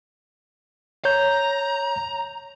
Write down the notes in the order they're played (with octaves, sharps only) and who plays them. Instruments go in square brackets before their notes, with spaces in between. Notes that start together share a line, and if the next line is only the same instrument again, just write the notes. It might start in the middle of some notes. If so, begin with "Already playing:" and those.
[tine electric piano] C#5 G6 [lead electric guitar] A#5